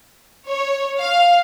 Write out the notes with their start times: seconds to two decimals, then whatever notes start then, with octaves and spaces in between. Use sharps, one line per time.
0.48 C#5
0.98 F5